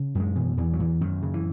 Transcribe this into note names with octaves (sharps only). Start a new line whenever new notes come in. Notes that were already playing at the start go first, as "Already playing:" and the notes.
Already playing: C#3
F#2
G#3
B2 E3
E2 E3
F#3
E2 E3
F#2 D#3
C#3
E3